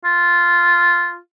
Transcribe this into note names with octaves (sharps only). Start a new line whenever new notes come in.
F4